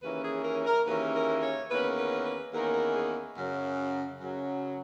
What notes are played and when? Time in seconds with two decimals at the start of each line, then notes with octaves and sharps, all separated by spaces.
0.03 D#2 C#3 E3 A#3 C#4 B4
0.24 G#4
0.45 A#4
0.66 A#4
0.87 D#2 C#3 E3 A#3 C#4 B4
1.14 A#4
1.42 C#5
1.70 E2 D#3 A#3 C#4 B4
1.98 B4
2.25 B4
2.53 E2 D#3 A#3 C#4 A#4
2.74 A#4
2.95 G#4
3.36 F#2 C#3 F#3
4.20 F#2 C#3 F#3